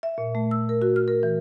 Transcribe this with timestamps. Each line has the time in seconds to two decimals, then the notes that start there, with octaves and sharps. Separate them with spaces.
0.03 E5
0.18 A#2
0.35 A3
0.51 E6
0.69 A#4
0.82 F#4
0.96 F6
1.08 A#4
1.23 E3